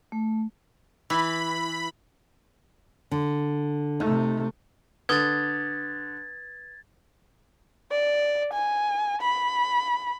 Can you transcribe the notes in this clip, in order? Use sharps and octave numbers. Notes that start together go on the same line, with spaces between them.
A3
E3 B5
D3
C3 A3 D#4
D3 B4 D#6 G#6 A6 G7
D5
G#5
B5